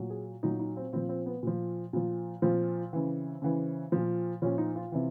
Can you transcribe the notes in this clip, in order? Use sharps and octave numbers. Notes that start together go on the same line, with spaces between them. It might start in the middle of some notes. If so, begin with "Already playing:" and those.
Already playing: A#2 F#3
G#4
A#2 F#3 D#4
D#4
C4
A#2 F3 C4
C4
B3
A#2 F3
A#2 F3
A#2 F3 C4
C#3 E3
C#3 E3
A#2 F3
A#2 F3 C#4
D#4
F4
C3 E3